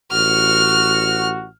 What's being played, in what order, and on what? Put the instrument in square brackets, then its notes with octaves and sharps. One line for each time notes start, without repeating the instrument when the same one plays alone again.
[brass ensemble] A1 F#4 [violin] F6